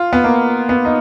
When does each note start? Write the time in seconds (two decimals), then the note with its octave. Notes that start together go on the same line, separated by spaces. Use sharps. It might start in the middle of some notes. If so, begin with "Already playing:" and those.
Already playing: F4
0.13 B3
0.24 A#3
0.69 B3
0.85 D#4